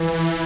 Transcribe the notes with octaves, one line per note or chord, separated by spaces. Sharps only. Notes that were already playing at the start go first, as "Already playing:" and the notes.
Already playing: E3